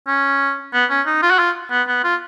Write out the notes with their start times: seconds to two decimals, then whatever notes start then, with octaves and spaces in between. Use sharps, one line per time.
0.08 C#4
0.74 B3
0.90 C#4
1.06 D#4
1.22 F4
1.31 F#4
1.39 F4
1.71 B3
1.88 B3
2.04 F4